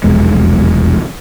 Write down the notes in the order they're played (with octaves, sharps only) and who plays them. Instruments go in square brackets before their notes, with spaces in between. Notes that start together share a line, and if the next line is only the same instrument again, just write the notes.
[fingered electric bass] F1 B1 E2 G#3